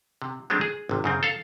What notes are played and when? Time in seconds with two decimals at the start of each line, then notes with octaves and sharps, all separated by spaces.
0.22 C3
0.50 F#3 G#3 A3 C4 D4
0.61 G#4
0.89 G#1 C3
1.04 F#2 C#3 C4
1.23 A4 F5